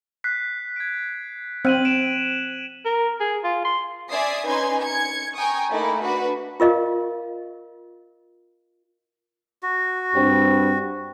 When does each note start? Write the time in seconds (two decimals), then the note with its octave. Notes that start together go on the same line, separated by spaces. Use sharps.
0.24 F#6 B6 C7
0.76 G#6 D7
1.65 C4 F#6 D#7 F#7
1.85 D7 E7
2.86 A#4
3.20 G#4
3.44 F4
3.65 C6
4.09 D5 E5 G#5 D#6 C7
4.46 C#4 D#4 B4 G#5 C6 G#6
4.80 G#6 C#7
5.35 G5 G#5 A#5 C#6 D#6
5.70 A3 A#3 D#4 E4
6.03 D4 F#4 B4
6.60 F4 A#4 D#5 F5
9.63 F#4
10.15 G2 G3 C4